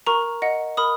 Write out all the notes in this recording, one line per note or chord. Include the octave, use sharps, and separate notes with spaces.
A#4 A#5 C#6
D#5 F#5
A#4 B5 D#6